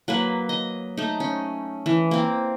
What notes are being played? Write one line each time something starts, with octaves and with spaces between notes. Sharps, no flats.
F#3 A#3 B4
D#5
A3 D#4
C#4
E3
A#3 C4